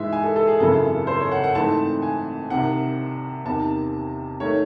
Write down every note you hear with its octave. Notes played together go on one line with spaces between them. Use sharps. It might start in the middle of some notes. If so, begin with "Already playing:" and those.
Already playing: G#2 E3 G#3 E5
G#5
A4
A4
G#4
G#1 F#2 C#3 E3 A4
C5
C#5
F#5
F#5
G#2 E3 A3 C4 A5
G#5
C2 C3 D#3 F#5
E2 C3 D#3 A5
D#3 A3 C#5